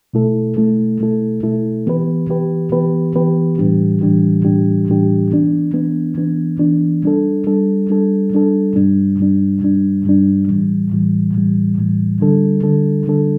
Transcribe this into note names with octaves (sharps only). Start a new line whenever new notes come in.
B2 A3 E4 A4
B2 A3 E4 A4
B2 A3 E4 A4
B2 A3 E4 A4
E3 B3 G4 B4
E3 B3 G4 B4
E3 B3 G4 B4
E3 B3 G4 B4
A2 E3 G3 D4 G4
A2 E3 G3 D4 G4
A2 E3 G3 D4 G4
A2 E3 G3 D4 G4
E3 B3 D4
E3 B3 D4
E3 B3 D4
E3 B3 D4
G3 D4 A4
G3 D4 A4
G3 D4 A4
G3 D4 A4
G2 G3 D4
G2 G3 D4
G2 G3 D4
G2 G3 D4
A2 E3 G3
A2 E3 G3
A2 E3 G3
A2 E3 G3
D3 G3 D4 A4
D3 G3 D4 A4
D3 G3 D4 A4